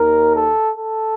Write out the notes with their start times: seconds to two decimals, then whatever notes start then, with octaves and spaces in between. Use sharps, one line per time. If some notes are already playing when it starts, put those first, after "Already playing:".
Already playing: D#2 D#3 A#4
0.34 A4
0.76 A4